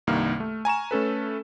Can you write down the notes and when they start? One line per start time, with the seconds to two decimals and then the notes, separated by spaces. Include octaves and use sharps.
0.07 C2 G2 D#3 A#3 F6
0.40 A3
0.65 G#5 A#5 C#6 E7
0.91 A3 C#4 A4 B4